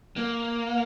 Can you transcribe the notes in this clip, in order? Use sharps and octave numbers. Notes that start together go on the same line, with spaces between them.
A#3